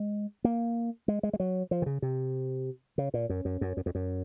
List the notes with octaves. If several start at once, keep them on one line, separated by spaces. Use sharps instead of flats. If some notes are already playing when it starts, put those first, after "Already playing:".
Already playing: G#3
A#3
G#3
G#3
G#3
F#3
F3
D#3
C#3
C3
C#3
A#2
F#2
F#2
F#2
F#2
F2
F#2